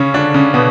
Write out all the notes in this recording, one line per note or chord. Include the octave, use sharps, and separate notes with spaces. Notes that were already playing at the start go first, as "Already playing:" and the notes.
Already playing: C#3 C#4
D3 D4
C#3 C#4
B2 B3